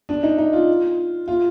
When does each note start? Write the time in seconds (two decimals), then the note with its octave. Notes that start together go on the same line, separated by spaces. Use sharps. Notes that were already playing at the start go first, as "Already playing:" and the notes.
0.09 D4
0.23 D#4
0.38 D#4
0.53 F4
1.28 F4